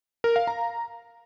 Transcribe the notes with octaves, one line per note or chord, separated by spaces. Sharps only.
A#4
F5
A#5